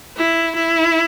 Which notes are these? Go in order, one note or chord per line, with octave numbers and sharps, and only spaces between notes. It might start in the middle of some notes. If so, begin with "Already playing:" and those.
E4
E4